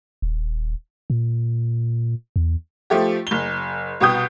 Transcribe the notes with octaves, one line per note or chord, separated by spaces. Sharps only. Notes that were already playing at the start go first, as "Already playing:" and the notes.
D#1
A#2
E2
F3 A3 G4
F#1 G7
C2 B2 G5 D#6 G6